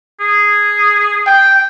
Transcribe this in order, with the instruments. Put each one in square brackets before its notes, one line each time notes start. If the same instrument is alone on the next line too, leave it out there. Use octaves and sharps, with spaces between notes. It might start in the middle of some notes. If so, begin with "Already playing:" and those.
[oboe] G#4
[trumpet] G5